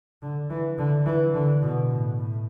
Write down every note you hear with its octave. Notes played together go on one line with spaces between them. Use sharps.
D3
E3
D3
E3
D3
B2
A2
A2